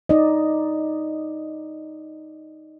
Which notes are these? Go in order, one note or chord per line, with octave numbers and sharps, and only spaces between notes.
D#4 D5 D#5